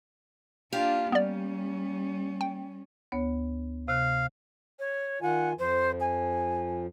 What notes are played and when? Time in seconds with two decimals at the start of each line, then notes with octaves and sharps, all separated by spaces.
0.73 A#3 D4 F4 G4 F5
1.12 G3 B3 C#4 D5
2.41 G5
3.12 D2 B3 C#5
3.88 C3 F5 F#6
4.79 C#5
5.22 D#3 F4 F#5 G#5
5.59 F2 F3 C5
6.00 G#5